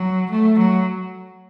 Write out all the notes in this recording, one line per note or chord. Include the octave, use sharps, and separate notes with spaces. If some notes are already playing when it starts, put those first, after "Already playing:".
Already playing: F#3
A3
F#3